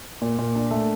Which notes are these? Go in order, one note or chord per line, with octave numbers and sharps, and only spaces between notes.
A#2
A#2
D4
A3